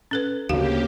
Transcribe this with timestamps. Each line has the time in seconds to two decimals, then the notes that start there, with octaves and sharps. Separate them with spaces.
0.11 C#4 A4 B4
0.49 D2 C#3 A#3 F#4 G4 F5